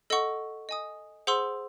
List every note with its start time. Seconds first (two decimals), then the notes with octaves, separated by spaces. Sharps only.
0.10 A4 D#5 F#5 C#6
0.69 D#5 G#5 D#6
1.27 G#4 C5 F#5 C6 E6